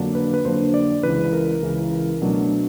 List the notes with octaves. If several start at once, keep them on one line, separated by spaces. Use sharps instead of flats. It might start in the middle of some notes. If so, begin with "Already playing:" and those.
Already playing: F2 D3 F#3 A#3 D4
B4
B4
F2 D3 F#3 A#3 D4 C5
D5
C#2 C#3 E3 B4
A#4
C#2 C#3 E3
B2 F#3 A3 D4